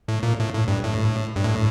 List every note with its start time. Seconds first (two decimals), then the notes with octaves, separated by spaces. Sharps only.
0.08 A2
0.23 A#2
0.39 A2
0.53 A2
0.68 G2
0.83 A2
1.36 G2
1.44 A2